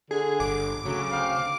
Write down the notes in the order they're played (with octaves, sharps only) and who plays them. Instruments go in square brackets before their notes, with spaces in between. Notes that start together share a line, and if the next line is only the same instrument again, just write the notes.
[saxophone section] D3 [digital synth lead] G#4
[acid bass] G1 [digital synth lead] D6
[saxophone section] D2 F#3 [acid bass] C#3
[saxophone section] D2 C4 F5